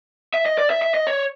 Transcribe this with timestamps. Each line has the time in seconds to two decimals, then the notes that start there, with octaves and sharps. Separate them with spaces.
0.34 E5
0.46 D#5
0.58 D5
0.70 E5
0.82 E5
0.94 D#5
1.07 C#5